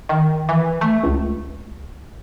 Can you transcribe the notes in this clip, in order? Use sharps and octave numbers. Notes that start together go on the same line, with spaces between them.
D#3
E3
A3
C#2